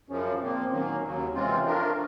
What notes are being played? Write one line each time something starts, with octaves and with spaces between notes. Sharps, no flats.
F#2 C#3 F3 C#4
A#2 F3 A#3 C4
D#3 F#3 A#3 C#4
D#2 C#3 F#3
C3 E3 G#3 C4 C#4 F4
F3 A3 D4 F4 A#4